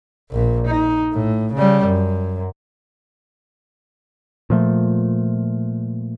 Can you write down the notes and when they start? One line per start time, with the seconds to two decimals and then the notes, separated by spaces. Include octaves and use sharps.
0.31 A#1 A#2
0.67 D#4
1.13 A2
1.53 C#3 G3
1.84 F#2
4.50 A#2 F3 A3